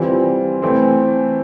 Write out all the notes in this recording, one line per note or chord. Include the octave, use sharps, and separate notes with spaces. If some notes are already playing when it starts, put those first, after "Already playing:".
Already playing: E3 G3 C4 F4
E3 A3 C4